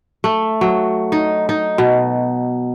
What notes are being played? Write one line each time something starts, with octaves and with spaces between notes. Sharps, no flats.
A3
F#3
D#4
D#4
B2